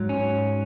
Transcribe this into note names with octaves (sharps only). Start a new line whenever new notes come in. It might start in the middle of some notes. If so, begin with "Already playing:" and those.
Already playing: G#2 F#3
C#4